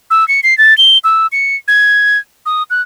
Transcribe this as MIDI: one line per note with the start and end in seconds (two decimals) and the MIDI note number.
0.10 0.27 88
0.28 0.40 97
0.43 0.57 96
0.58 0.76 93
0.78 0.98 103
1.04 1.27 88
1.32 1.56 97
1.68 2.18 92
2.46 2.63 87
2.70 2.81 90